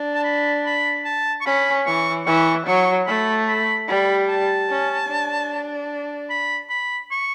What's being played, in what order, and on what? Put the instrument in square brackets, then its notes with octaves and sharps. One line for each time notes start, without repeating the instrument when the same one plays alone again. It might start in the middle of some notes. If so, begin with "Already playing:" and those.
Already playing: [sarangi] D4
[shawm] A5
B5
B5
A5
C#6
[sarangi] C#4 [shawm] B5
[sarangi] E3 [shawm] C#6
[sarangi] E3 [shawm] C#6
[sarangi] F#3 [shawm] C#6
[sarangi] A3 [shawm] B5
[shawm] B5
[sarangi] G3 [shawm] B5
[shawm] A5
[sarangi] C#4
D4
[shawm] B5
B5
C#6